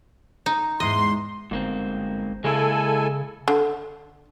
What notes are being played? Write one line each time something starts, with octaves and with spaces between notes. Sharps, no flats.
D#4
E2 G#2 D#5 C6
G1 G#2 A#3 C4
C#3 G#3 A#3 E4 A4 G#5
D3